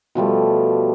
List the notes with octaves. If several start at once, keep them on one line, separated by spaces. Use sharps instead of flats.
B2 F3 G3 A3